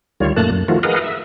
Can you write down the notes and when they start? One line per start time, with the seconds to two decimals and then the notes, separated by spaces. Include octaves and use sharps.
0.20 D2 D#3 G3 F4 C#5
0.36 F#2 A#2 A3 A#3 A5 F#6
0.51 F#2
0.68 D#3 F3 A3 F4 F#4
0.83 G#4 A#4 B4 D#5 F5 F#5
1.00 E5